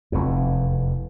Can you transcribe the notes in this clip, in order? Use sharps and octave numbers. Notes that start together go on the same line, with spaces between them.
F1 E2